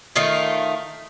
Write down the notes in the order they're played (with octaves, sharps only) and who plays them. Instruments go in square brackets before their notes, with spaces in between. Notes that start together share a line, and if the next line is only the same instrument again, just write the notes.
[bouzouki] D#3 A3 D#4 F4